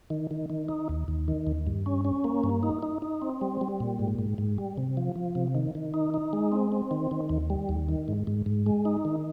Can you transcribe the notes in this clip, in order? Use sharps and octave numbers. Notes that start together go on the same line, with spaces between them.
D#3
D#3
D#3
D#4
D#2
D#2
D#3
D#2
G2
C#4
C#4
A#3
G2
D#4
D#4
D#4
C4
G3
G3
A#2
G#2
G#2
G#2
G3
C3
F3
F3
C3
D#3
D#3
D#4
D#4
G#3
C4
C4
D#3
D#3
D#2
G3
D#2
D#3
G#2
G#2
G#2
G#3
D#4
D#3